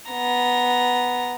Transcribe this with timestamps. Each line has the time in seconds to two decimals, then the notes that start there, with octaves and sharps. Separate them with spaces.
0.11 B3 A#5